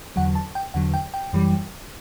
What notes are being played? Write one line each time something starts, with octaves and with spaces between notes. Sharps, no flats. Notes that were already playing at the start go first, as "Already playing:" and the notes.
E2 D3 F#3 F#5
A5
G5
E2 D3 F#3 F#5
G5
G5
F#2 E3 G3